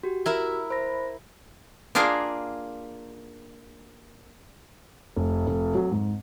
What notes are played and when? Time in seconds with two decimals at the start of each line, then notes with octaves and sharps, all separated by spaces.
0.03 F#4 G4
0.26 E4 A#4 E5
0.70 C5 B5 A#6
1.95 A#3 D4 F4 G#4 A#4
5.16 F1
5.47 F1
5.75 F#3
5.91 G#2